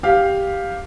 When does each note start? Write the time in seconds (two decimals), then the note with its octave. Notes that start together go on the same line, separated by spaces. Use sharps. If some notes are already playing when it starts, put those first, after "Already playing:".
0.03 G4 F5